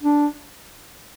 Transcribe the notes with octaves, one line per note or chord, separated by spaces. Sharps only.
D4